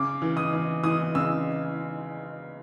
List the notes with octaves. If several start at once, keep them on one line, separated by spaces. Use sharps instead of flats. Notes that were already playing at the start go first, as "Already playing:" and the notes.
Already playing: C#3 D6
E3
D#6
E3
E3 D#6
C#3 E6